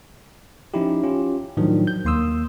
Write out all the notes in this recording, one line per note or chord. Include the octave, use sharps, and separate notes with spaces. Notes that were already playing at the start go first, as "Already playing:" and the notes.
F3 C#4 D#4 E4 G4
C#4 F4 G4
A2 D#3 F3 F#3 D4
G6
D#2 A#3 C6 D#6 E6